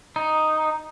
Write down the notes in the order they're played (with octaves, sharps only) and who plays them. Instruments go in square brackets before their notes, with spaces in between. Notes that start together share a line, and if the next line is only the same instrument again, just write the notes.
[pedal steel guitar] D#4